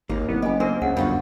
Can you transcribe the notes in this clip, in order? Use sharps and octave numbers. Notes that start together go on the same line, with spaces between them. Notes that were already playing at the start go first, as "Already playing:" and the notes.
G#1 D#2 A#3
C2 B3
F#1 G4 D#5 G#5
A#3 D4 A#4 C5
C#2 C#3 F#5
G1 F#2 G3 F4 F#4